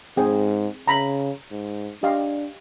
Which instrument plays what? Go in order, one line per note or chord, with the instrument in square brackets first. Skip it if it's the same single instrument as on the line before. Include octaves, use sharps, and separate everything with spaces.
[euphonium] G#2 [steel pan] C4 G#4 G5
[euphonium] C#3 [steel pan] A#5 B5
[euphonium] G#2
[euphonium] D4 [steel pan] G4 D#5 F5